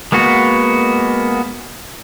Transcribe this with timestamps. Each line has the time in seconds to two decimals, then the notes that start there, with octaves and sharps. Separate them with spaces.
0.12 G#3 A#3 B3 F#4